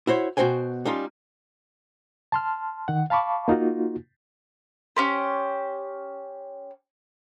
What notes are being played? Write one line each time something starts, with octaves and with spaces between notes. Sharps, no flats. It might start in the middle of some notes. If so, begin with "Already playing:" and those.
E4 F#4 C5 C#5
B2 D#3 F#4 C5 G5 G#5
G3 C#4 D#4 F4
A5 C6 F6
D#3 F#5
F5 A5 B5 C#6 D6
A#3 D#4 F4 F#4
C#4 G4 C5